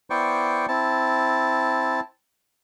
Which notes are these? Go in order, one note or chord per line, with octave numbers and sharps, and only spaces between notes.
B3 E4 C5 D5 G5 C#6
C4 E4 A5